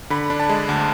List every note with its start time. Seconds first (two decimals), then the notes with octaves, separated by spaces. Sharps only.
0.10 D3 B5
0.30 D4
0.40 A5
0.49 G#3
0.69 D2